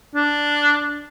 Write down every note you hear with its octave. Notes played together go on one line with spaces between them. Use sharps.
D4